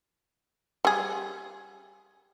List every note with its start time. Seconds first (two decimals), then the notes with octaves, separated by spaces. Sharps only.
0.85 G3 G#4